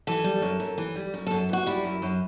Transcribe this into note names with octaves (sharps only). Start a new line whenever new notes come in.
E3 A4
G3
F#2
F#2
E3
G3
F#2
F#2 A4
E3 F#4
G3 E4
F#2
F#2